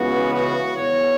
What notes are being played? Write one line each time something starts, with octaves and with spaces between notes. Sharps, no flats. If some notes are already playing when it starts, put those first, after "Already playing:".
Already playing: C#2 C#3 E3 B3 F#4
F#4
E2 E3 B3 C#5